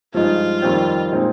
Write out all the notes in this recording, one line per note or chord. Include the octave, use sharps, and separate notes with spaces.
G2 F3 G#3 D#4 F4
F2 D#3 G3 C4
A#2 G#3 C4 D#4